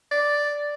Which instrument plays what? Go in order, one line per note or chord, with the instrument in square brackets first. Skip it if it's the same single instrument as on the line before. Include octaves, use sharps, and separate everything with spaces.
[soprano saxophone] D5